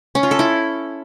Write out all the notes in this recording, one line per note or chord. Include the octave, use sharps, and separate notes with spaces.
C#4
F4
A4
E4